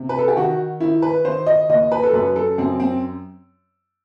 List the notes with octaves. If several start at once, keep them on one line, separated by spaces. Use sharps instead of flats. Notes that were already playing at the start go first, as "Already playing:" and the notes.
Already playing: C3
B4
A4
G4
D#3 F#4
D#3 E4
B4
D#3 C5
D#5
D#2 D#5
B4
A4
F#2 B4
A4
F#2 C4
C4